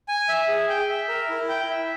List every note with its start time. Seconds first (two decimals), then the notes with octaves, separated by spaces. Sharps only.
0.08 G#5
0.28 E5
0.48 G#4
0.69 G5
0.89 E5
1.09 A#4
1.29 E4
1.49 G5
1.70 E5